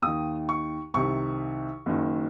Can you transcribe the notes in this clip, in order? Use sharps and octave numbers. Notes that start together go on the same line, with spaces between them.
D#2 D#3 D#6
C#6
C2 C3 D#3 C#6
F#1 F#2 D#3